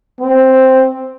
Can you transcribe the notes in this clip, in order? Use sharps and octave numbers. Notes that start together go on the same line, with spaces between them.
C4